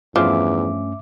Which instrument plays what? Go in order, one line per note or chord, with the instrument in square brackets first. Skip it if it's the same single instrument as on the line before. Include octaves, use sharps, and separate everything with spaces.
[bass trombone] E2 [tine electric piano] G2 A3 C#4 [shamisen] F3 [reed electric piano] E5 D6